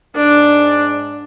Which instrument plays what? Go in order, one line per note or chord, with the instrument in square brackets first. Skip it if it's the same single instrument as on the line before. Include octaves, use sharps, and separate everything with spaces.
[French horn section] G#2 D5 [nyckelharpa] D4